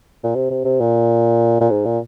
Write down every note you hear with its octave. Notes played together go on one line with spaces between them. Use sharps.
A#2
C3
C3
C3
A#2
A#2
G#2
A#2